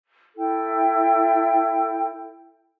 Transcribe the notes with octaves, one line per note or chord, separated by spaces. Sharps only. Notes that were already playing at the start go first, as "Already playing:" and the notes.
E4 A4 G5